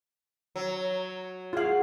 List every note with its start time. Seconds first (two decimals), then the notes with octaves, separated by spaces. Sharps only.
0.56 F#3
1.53 F4 G#4 F5 F#5